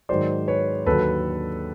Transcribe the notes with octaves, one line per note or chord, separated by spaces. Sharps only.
G#2 D#3 F#3 C5 D5
B4 C#5
D#2 D3 F#3 A4 B4